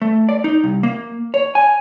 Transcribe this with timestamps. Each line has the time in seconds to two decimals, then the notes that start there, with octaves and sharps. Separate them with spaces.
0.02 A3
0.29 D5
0.44 D#4
0.64 C2
0.83 A#3
1.34 C#5
1.55 G#5